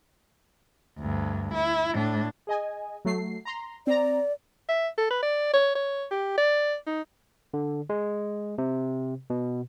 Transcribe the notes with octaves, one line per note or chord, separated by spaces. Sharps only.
D2 G2
E4
A2 D4
G#4 D#5 G#5
F#3 A3 C7
A#5 C6
C4 D5 A#5
E5
A4
B4
D5
C#5
C#5
G4
D5
D#4
D3
G#3
C3
B2